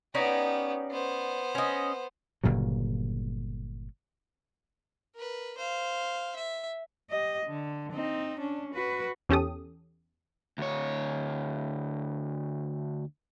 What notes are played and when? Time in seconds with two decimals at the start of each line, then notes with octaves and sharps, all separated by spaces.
0.15 B3 C#4 D#4 G4 D5
0.91 B3 C5
1.55 C#4 D#5
2.43 G1 A#2 C#3 F#3
5.15 A#4 B4
5.58 C5 F5
6.36 E5
7.10 G4 D#5
7.46 D3
7.92 C4 D#4
8.40 C#4 D4
8.74 F#4 B4
9.29 E2 C#4 G4 A4 D#6
10.58 D2 C#5